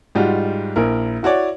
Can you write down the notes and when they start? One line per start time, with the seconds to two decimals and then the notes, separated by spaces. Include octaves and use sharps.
0.15 G#2 G3 F4 F#4
0.76 A#1 E4 A#4
1.23 E4 F#4 C#5 D5